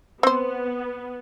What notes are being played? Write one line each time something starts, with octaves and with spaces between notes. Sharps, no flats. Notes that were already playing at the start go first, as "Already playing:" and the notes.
B3 C4 C5